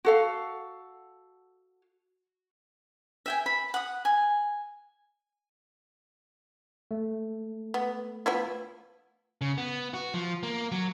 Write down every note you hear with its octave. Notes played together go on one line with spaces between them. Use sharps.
F#4 A4 F5
E5 G5 G#5
B5
F#5 D#6
G#5
A3
B3
F3 B3 E4
C#3
B3
F#4
F3
A#3
F#3